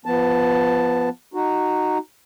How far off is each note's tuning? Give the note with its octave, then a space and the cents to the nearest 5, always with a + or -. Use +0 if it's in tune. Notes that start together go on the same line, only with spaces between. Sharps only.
F3 -20 B3 +0 A5 +0
D#4 -10 F#4 +0